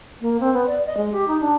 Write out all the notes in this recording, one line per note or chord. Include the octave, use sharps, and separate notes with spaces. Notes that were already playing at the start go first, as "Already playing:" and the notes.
A#3
C4
B3
D5
D#5
G#3
G4
D#4
D4